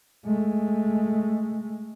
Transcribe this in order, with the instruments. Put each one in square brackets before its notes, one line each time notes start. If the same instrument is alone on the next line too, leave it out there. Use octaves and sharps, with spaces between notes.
[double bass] G#3 A3